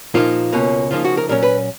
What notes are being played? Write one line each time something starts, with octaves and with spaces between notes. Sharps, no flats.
A#2 F3 A#3 D#4 F4
C#2 B2 A#3 C#4
C#3 F3 A#3 D#4 F4
F#4
A#4
A#2 F#3 C#4 A#4
B4